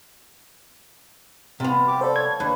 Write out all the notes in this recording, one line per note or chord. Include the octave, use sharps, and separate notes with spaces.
C3 F3 G3 B3 F4
G4 D6
A4 C5 D5
C#5 G#6
D#2 D4 B4